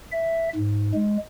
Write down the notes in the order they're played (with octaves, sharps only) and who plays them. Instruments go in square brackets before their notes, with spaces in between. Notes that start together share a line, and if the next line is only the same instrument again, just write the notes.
[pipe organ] E5
G#2
G#3